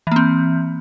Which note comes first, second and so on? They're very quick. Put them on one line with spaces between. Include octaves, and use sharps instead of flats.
E3 A#3 C4